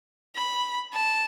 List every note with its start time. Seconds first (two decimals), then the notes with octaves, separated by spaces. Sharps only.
0.36 B5
0.93 A5